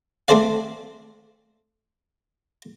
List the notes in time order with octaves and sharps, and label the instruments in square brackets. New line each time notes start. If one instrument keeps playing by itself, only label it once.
[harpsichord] A3 C4 A4 C5 D5 F5